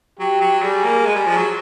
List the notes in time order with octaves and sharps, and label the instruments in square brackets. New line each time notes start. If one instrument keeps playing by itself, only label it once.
[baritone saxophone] F#3 [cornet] G4
[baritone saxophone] F#3
[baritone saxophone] G3 [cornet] G#4
[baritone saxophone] A#3
[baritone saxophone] G#3 [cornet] G#4
[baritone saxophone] G3
F3
F#3